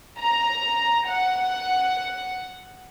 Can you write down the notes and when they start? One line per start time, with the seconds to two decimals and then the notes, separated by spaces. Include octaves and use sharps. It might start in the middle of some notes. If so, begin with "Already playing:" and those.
0.20 A#5
1.08 F#5